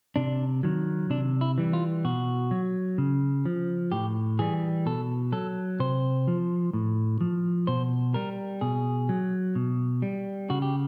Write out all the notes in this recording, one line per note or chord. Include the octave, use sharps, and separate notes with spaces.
C3 D4
D#3 F#3
C3 D4
E4
E3 G3
F4
B2 F#4
F#3
C#3
F3
A2 G4
E3 G3 G#4
B2 A4
F#3 A4
C3 C5
F3
A2
F3
B2 C5
G3 A#4
B2 G#4
F#3
B2
G3
C#3 F#4
G4